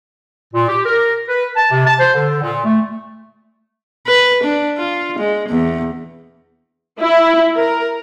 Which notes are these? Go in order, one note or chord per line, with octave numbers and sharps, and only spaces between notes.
A#2
G4
A#4
B4
A5
C3
A5
C5
D3
A#2
A3
B4
D4
F4
G#3
E2
E4
A#4